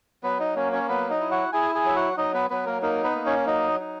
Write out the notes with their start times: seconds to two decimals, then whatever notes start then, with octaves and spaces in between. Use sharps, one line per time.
0.24 F#3 B3 B4
0.40 D#4 D#5
0.56 A#3 C#4 C#5
0.72 C#4 C#5
0.89 F#3 B3 B4
1.10 D#4 D#5
1.20 E4
1.31 F#4 F#5
1.53 E4 G#4 G#5
1.75 G#4 G#5
1.85 F#3 E5
1.96 F#4 F#5
2.17 F#3 D#4 D#5
2.34 B3 B4
2.50 F#3 B3 B4
2.66 A#3 A#4
2.82 A#3 D#4 A#4
3.04 B3 B4
3.15 A#3
3.26 C#4 C#5
3.46 F#3 D#4 D#5
3.80 D#4